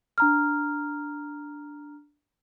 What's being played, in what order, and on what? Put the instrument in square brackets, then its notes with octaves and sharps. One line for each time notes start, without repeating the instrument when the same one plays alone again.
[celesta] D4 A#5 F6